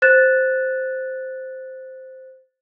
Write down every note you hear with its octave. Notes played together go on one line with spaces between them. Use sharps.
C5 F#6 A6 E7